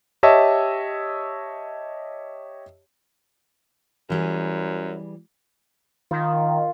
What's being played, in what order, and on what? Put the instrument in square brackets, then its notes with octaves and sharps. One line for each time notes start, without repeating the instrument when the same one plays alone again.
[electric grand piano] G4 C#5 D#5 E5 A5 E6
[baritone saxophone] F#2 [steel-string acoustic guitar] E3 G3 G#4
[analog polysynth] D#3 [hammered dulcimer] F4